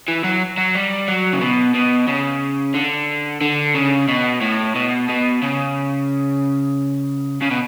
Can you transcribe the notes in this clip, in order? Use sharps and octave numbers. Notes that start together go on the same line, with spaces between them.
E3
F#3
F#3
G3
F#3
C#3
B2
B2
C#3
D3
D3
C#3
B2
A2
B2
B2
C#3
C#3
B2